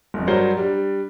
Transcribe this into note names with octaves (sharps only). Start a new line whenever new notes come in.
G1 F2
G2 F#3 A#4 C5 D5 G7
G3 D4